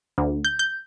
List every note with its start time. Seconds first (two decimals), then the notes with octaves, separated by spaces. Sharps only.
0.18 D2
0.45 G6
0.59 G6